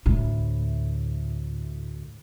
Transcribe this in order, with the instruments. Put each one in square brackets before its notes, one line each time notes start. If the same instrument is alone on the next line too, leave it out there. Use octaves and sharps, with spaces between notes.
[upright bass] D2 A2